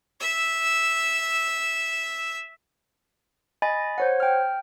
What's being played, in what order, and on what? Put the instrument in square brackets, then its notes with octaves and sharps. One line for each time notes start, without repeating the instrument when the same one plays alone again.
[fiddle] E5 E6
[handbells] D#5 G#5 B5 A6
C5 C#5 F#5
G5 F6